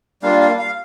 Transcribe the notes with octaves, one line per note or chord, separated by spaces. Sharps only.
G3 A#3 D4 F4 F5
F5
F5